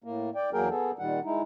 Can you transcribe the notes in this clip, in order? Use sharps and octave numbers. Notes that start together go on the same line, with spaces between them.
A2 A#3
D5 G5
E2 F#3 A#3 G#4 A#4 G5
B3 G#4 A4
A#2 D#3 G3 F#5
G#3 D#4 E4